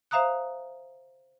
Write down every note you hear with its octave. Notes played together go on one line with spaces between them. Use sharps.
C5 E5 F5 A#5 D#6 F#6